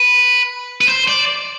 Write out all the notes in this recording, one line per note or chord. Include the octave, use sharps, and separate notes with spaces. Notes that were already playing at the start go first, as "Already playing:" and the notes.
Already playing: B4
B4
C5
D5